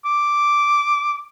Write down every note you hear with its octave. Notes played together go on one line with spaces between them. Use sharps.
D6